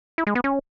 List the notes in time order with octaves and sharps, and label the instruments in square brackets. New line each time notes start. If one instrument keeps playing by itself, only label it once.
[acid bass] E4
G#3
B3
C#4